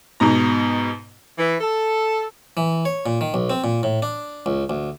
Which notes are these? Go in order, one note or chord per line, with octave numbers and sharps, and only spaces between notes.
G#2 B2 A#5
E3
A4
E3
C#5
A#2
D#3
B1
C4
A#2
A2
D4
C#2
D2